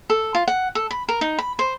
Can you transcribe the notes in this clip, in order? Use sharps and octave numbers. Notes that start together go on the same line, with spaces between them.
A4
F4
F#5
A4
B5
A#4
D#4
B5
C5